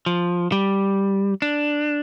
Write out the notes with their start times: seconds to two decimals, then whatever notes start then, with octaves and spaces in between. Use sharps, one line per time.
0.06 F3
0.52 G3
1.42 D4